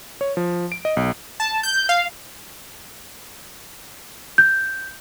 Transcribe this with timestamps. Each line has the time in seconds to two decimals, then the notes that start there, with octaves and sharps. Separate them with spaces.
0.21 C#5
0.37 F3
0.72 D7
0.85 D#5
0.97 B1
1.40 A5
1.63 G6
1.89 F5
4.38 G6